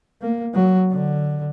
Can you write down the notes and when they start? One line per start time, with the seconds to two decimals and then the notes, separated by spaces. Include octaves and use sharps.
0.21 A#3
0.54 F#3
0.91 D3